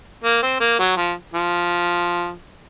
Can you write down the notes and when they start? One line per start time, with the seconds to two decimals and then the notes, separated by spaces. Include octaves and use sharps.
0.24 A#3
0.42 C4
0.60 A#3
0.79 F#3
0.97 F3
1.34 F3